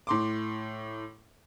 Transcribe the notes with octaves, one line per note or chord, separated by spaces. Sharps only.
A2 C6 D6